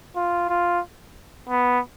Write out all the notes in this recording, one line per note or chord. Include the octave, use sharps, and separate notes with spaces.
F4
F4
B3